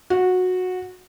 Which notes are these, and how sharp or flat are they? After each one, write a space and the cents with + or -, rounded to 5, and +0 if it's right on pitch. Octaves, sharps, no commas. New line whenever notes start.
F#4 -15